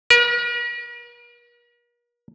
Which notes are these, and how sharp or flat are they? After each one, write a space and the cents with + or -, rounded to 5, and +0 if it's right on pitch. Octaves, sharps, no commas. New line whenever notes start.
A#4 +45